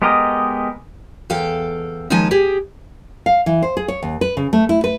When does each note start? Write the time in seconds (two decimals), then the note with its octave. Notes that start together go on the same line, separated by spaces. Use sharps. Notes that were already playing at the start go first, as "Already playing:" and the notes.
0.02 G#3 B3 G4 A#4 D#5
1.30 E2 A4 F5 G5
2.10 D#2 F3 G#3 D#4 G#5 A5
2.31 G4 G#4
3.26 F5
3.46 E3
3.63 C5
3.77 G#4
3.88 C#5
4.03 D#2
4.21 B4
4.37 C#3
4.53 A3
4.69 E4
4.84 B4